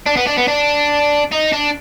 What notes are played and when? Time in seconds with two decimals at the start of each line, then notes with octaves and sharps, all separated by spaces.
0.06 D4
0.17 B3
0.27 D4
0.38 B3
0.48 D4
1.32 D#4
1.52 D4